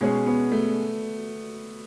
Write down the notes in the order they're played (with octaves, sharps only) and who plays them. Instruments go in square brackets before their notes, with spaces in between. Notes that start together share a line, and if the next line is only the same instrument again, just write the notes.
[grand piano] B2 G#3 C#4 G#4
[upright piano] B3
A3